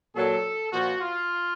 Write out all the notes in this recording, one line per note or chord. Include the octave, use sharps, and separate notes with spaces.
A#2 F#3 A4
A#2 F3 F#4
F4